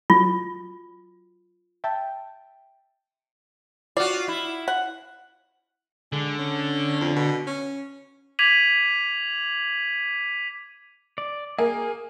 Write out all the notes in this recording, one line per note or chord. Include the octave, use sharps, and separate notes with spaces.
F#3 F4
E5 G5 A5
F4 F#4 D5
E4
F#5
D3 G#3
C#4
F2
B2
C#4
D6 G#6 B6 D#7 F7 F#7
D5
A#3 G#4